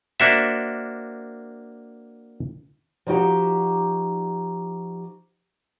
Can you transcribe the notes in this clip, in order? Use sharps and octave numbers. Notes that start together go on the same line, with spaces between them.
A#3 D4 F#4 C5 E5
F3 D#4 F#4 G4 A#5